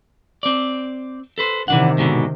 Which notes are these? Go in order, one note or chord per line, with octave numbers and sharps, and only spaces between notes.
C4 D5
A4 B4 C5
C3 D#3 E3 D4 F#5
G#2 B2 D3